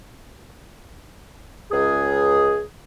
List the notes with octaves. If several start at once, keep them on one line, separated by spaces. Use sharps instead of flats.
C#2 G#4